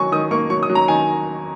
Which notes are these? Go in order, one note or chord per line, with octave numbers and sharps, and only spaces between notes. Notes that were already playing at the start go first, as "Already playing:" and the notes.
Already playing: D#3 F#3 G#5 C#6
D#3 D#6
A#3 C#6
F#3 C#6
D#6
F#3
A#5
D#3 G#5